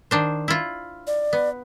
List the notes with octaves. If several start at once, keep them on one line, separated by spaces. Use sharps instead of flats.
D#3 D4 C5
E4 F4
D5
B3